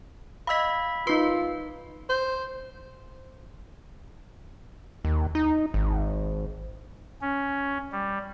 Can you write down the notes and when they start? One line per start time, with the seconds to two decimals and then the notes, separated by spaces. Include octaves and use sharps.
0.47 D#5 F5 B5 E6 B6
1.07 D#4 F4 B4 C6
2.10 C5
5.05 D#2
5.35 D#4
5.74 G#1
7.21 C#4
7.92 G3